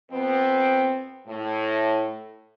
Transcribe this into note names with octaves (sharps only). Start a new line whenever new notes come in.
F2 B3 C4
A2